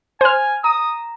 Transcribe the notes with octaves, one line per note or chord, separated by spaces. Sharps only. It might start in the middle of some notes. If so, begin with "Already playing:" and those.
C5 G#5 F6
A#5 D#6